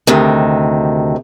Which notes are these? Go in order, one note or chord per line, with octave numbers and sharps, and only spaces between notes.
D2 C3 D#3